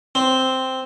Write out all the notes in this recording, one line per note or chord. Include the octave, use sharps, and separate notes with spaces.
C4